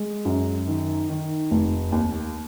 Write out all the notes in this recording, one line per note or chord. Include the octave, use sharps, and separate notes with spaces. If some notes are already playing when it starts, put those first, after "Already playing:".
Already playing: G#3
F#2
D#3
D#3
F1
D#2